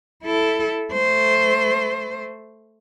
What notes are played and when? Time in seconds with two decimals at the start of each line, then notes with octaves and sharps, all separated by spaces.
0.24 E4 A4
0.93 A3 C5